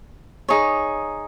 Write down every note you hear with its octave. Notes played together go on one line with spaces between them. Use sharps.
D#4 G#4 C#5